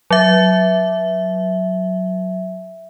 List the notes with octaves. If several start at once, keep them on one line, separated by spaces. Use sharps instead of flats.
F#3 E5